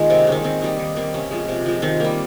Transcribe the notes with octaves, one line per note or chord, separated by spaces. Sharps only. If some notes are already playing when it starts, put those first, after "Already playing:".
Already playing: D#3 G#3 A#3 F4
C3 C4
D#3 G#3 C#4
D#3 C4
G3 A#3 D#4
D#3
G3 A#3 C4
C3 C#4
F3 G#3
C3
F3 G#3
D#3 C4
G3 A#3